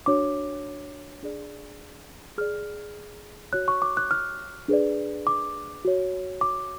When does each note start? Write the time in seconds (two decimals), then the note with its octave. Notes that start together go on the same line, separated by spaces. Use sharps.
0.06 D4 F#4 C#5 D6
1.23 D4 G#4 D5
2.38 G#4 D5 F6
3.53 F#4 C#5 F#6
3.68 C#6
3.82 D6
3.97 F#6
4.11 F6
4.68 D4 G#4 B4 D5
5.27 D6
5.85 F#4 C#5
6.41 D6